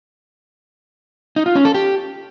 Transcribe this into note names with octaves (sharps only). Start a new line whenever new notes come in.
D#4
F4
C#4
A4
G4